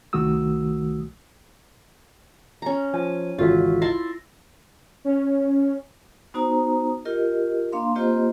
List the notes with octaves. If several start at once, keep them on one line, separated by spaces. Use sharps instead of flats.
C2 D#3 A3 F#4 D#6 E6
C#4 A#5
F3 G#5
G#1 C#2 E3 F4 F#4 A4 E5
E4 A5 C6 A#6
C#4
B3 D#4 F#4 C5 A#5 D#6
F4 G4 A#4 D#5
A#3 D4 F5 C6
A#3 C4 F4 G4 C5 D#5